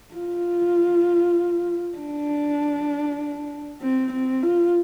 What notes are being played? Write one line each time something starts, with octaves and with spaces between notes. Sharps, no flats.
F4
D4
C4
C4
F4